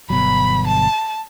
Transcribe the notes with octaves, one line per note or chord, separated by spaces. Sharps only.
G1 B2 F#3 B5
A5